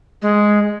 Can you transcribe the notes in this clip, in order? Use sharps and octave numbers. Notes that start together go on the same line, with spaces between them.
G#3